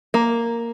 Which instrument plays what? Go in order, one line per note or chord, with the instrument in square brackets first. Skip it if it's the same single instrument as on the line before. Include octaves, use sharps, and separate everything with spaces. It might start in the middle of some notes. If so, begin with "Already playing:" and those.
[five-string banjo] A#3